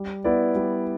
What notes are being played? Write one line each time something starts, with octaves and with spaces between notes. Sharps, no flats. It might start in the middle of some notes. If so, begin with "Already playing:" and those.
Already playing: G3
B3 E4 B4 D5
G3